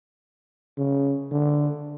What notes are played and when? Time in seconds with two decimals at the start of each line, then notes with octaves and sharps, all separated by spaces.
0.78 C#3
1.31 D3